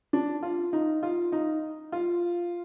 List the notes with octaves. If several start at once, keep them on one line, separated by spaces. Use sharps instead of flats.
D4
F4
D#4
F4
D#4
F4